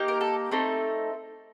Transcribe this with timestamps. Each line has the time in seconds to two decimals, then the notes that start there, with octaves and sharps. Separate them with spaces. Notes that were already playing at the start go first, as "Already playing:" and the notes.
Already playing: A#3 D#4 G4
0.08 A#4
0.21 A4
0.51 A3 C4 D#4 A4